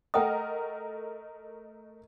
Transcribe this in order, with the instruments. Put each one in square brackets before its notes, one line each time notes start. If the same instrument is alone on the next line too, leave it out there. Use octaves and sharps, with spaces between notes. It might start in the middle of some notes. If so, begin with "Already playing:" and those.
[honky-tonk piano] A3 A#4 D#5 [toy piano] F#5 G5 D#6